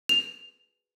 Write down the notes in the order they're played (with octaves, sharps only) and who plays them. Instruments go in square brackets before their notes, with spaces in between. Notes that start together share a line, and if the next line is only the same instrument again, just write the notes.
[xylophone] F7